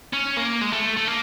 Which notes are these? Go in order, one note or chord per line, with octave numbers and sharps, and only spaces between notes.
C#4
A#3
G#3
A3
A3
A#3